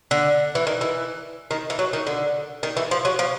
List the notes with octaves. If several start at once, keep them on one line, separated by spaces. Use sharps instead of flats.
D3
E3
D#3
E3
D#3
E3
F#3
D#3
D3
D#3
E3
F3
F#3
F3